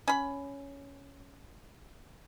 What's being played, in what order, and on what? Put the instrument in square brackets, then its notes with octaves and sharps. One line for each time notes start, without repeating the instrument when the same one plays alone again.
[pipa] C#4 B5